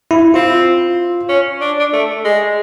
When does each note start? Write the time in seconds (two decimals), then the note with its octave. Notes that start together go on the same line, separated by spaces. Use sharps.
0.11 E4
0.34 C4 F4
1.29 C#4
1.61 D4
1.80 D4
1.93 A3
2.25 G#3